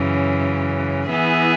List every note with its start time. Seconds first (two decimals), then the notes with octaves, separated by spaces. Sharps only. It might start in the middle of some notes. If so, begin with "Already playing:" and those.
Already playing: F#2 C#3 E3
1.09 E3 B3 E4 G#4